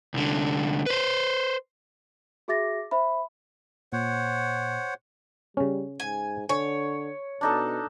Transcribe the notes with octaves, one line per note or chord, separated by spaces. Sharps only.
C2 D3
B4 C5
F#4 G#4 E5 D6 A6 A#6
C5 E5 B5
A#2 C5 C#5 F#5
C#3 G3 C#4
G#2 G#5
D3 C#5 G#5
B2 D4 D#4 A4